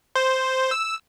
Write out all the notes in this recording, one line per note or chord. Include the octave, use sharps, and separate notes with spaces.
C5
E6